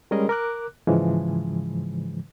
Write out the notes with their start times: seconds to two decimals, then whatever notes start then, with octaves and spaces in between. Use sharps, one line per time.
0.11 G3 G#3 C#4 G#4 A#4 D#5
0.29 A#4 D6 F#6
0.87 G#2 C#3 E3 F3 G#3